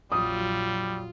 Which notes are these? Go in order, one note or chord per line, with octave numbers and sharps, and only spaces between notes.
A#1 F2 F#3 G3 F4 D#6